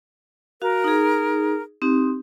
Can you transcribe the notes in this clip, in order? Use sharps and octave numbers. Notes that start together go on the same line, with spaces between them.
F#4 A#4 F5
D#4 G#4
C4 D#4 G4